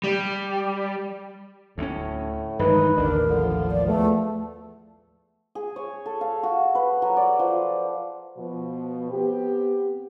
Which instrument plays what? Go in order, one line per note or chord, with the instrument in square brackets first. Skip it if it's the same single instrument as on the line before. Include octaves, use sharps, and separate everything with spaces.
[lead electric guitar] G3
[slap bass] D2 G#3 C#4 [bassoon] A2
[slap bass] G2 E3 G#3 [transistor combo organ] D#3 D#4 [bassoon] B4
[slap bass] A1 D#2 [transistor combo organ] D3 D4 [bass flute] A#4
[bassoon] D3 [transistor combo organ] F3
[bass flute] D5
[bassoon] E2 [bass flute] A3
[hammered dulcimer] G#4
C#5
A4
F5
F#4
B4
F#3
D5
F3
[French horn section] B2 F3
B3 C4 G4